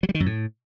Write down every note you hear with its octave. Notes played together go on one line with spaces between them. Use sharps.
F#3
G3
D#3
F#2
A2